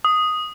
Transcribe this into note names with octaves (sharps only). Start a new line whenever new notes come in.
D#6